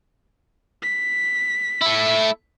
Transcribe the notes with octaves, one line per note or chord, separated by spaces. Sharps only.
B6
A3 E4